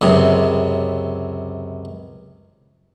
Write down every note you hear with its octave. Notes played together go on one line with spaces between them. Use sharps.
C#2 F#2 C3